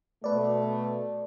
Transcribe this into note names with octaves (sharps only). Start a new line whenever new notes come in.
B2 A3 B4 D5